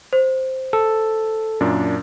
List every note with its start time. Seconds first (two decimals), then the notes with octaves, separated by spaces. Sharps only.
0.13 C5
0.73 A4
1.61 F#2 A#2 D4